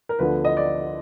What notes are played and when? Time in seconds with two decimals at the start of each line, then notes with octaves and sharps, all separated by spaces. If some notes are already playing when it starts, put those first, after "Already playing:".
0.09 A#4
0.19 D2 D3 F3 B3 B4
0.45 D#5
0.57 D5